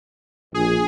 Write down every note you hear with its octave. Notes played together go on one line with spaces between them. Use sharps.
A#1 G#4